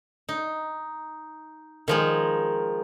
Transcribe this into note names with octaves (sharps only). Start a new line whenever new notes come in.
D#4
D#3 F3 G#3